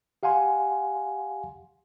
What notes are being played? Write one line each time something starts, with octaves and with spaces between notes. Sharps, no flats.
G4 F5 F#5 G#5 C6